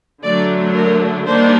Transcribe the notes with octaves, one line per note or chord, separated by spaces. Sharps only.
D3 F#3 A3 D4 D5
A#4
D#3 G3 A#3 D4 C5